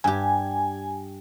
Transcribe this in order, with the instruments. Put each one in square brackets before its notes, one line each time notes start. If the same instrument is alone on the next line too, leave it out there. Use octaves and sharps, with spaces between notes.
[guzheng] G2 G4 [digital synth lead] G#5